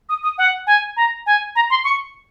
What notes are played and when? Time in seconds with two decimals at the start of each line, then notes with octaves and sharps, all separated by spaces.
0.09 D#6
0.23 D#6
0.38 F#5
0.67 G#5
0.97 A#5
1.26 G#5
1.56 A#5
1.70 C6
1.84 C#6